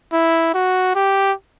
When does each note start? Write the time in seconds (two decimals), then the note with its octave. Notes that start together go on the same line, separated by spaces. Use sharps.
0.13 E4
0.54 F#4
0.95 G4